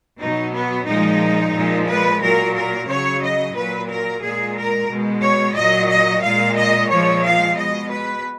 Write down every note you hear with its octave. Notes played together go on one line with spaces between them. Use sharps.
B2 F#3 D#4
B3
A#2 F3 G#3 D#4
A#2 F3 G#3
B4
A#2 F#3 A#4
A#4
C#3 F#3 C#5
D#5
A#2 F#3 B4
A#4
A#2 G#3 G#4
A#4
B2 G#3
C#5
A#2 F#3 D#5
D#5
A#2 G#3 F5
D#5
A#2 F3 G#3 C#5
F5
B2 G#3 D#5
B4